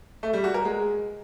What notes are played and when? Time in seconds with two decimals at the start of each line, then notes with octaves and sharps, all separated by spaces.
0.23 A3
0.33 G3
0.44 F#4
0.54 A#4
0.65 G#3